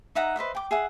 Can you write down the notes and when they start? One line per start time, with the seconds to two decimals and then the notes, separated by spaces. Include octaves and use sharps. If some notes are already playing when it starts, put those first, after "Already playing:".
0.15 D#4 E5 F#5 A#5
0.36 B4 C5 D#5 E5
0.55 G5 D6
0.71 G#4 E5 F#5